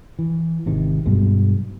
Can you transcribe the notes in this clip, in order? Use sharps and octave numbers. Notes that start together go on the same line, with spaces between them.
E3
G#1 C3 D#3
G2 B2 F#3 G#3